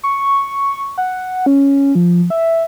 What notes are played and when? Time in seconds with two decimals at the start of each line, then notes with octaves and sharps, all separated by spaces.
0.03 C#6
0.98 F#5
1.46 C#4
1.95 F3
2.30 E5